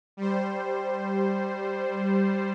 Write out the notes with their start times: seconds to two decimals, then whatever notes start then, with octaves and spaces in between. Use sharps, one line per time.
0.17 G3 C5